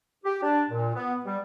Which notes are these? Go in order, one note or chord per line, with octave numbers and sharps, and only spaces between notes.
G4
D4
A#2
B3
G3